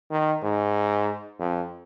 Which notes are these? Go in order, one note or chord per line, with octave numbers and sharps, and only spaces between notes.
D#3
G#2
F2